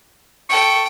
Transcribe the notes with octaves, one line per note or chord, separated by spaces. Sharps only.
A4 G5 C#6